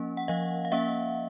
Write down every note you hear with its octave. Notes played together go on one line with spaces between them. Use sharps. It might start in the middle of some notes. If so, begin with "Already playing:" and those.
Already playing: F3 A#3 C#4
F#5
F3 D#5 F5
F5
A#3 C#4 E5 F#5